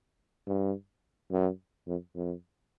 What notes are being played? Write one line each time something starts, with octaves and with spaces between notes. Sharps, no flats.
G2
F#2
F2
F2